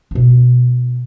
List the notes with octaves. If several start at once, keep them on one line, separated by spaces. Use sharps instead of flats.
B2 D4